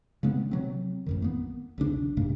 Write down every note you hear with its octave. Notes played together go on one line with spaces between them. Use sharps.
C#3 G#3 B3 C4
C3 F#3 C4
A1 F2 D#3
A#3 B3
B1 E2 C#3 D4
B1 G#2 C3 A#3